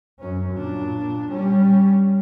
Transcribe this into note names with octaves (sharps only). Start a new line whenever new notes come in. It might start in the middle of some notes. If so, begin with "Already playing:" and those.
F#2 C#4
A#2 D4
G3 C#4